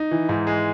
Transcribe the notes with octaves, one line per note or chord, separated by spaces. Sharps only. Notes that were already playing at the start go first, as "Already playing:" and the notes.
Already playing: D#4
E3
G#2
G#3